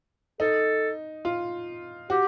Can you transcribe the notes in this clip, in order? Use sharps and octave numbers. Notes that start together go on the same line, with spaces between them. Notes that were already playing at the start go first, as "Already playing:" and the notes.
D#4 A4
F4
F#4 G4